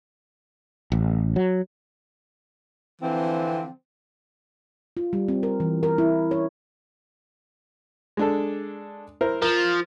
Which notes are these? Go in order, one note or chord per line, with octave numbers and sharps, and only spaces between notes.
A1
F#3
D3 E3 F3 C4
F4
G3
C4
A#4
E3
A#4
E4
C#5
G#3 D4 A4
E4 A#4 C5
F3 A#4